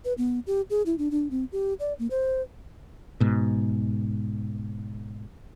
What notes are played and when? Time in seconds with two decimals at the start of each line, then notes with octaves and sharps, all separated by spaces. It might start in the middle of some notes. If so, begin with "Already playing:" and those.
0.05 B4
0.18 B3
0.47 G4
0.70 G#4
0.86 E4
0.98 D4
1.11 D4
1.31 C4
1.52 G4
1.80 D5
1.99 A#3
2.11 C5
3.20 G#2 B2